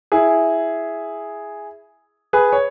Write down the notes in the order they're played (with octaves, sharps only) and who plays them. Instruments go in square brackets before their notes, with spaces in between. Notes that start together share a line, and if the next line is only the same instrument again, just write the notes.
[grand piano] E4 G#4
G#4 B4
C#5